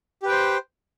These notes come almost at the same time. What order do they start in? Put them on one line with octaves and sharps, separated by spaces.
G4 B4 G5 C5